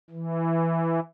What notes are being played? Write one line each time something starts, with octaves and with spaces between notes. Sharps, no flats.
E3